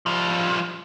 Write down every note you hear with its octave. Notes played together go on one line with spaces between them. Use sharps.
F3 G3